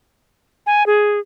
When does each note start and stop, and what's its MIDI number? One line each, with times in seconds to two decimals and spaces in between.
0.66 0.86 80
0.86 1.20 68